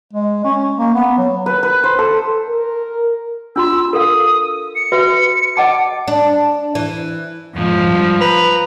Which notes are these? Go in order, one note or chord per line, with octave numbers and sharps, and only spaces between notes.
G#3
C#4
A#3
B3
F#3
B4
B4
C5
A4
A#4
D4 F4 C6 E6
A4 A#4 F5 D#6
C#7
F#4 B4 E5
D#5 F#5 A5 D6
D4
E3
F2 G#2 F3
G2
B4 A#5